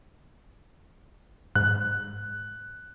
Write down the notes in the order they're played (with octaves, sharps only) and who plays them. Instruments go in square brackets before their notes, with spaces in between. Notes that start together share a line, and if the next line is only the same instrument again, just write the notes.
[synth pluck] G#2 [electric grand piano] F#6